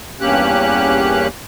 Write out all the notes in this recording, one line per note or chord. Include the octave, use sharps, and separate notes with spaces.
E2 G2 A#3 C#4 G4 F#6